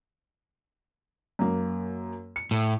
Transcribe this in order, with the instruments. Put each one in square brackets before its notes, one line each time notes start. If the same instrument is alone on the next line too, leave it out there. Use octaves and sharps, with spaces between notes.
[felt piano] F#2 A#3
C#7
[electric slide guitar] A2